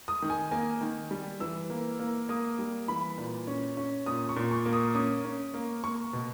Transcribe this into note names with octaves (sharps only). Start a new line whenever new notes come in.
D#6
D#3
G#5
A#3 G#5
D#3
G3
E3 E6
A#3
A#3
A#3 D#6
G3
E3 B5
A#2
C#4
C#4
A#2 D#6
C#6
A#2
C#6
A#3
D#6
C#4 D#6
C#4
A#3
A#3 C#6
B2